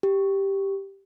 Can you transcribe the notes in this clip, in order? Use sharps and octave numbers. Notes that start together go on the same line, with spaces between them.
G4